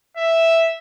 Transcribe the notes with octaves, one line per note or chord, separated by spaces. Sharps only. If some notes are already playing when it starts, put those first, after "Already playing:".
E5